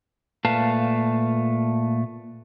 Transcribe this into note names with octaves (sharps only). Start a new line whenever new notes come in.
A#2 A3 B4 F5 A5